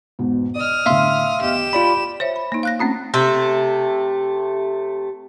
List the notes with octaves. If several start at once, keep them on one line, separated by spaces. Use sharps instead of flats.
E2 G#2 B2
D5 D#5 D#6 F6
A2 D3 E5 F5 C6
E2 G4 D#5 E7
F4 D5 B5
C5 C#5 E5
B5
A#3 D#4
F5 F#6 A#6
A3 C4 C#4 F4
C3 A3 E5